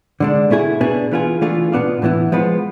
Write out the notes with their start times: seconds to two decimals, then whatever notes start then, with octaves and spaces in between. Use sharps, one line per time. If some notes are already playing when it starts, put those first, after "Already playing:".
0.20 D3 G#3 D4
0.50 B2 A3 E4 G#4
0.81 B2 B3 D4 G#4
1.11 E3 B3 F4 G#4
1.41 E3 A3 D4 F4 G#4
1.72 B2 B3 D4 F4
2.02 A2 E3 B3 E4
2.32 F3 G#3 B3 F4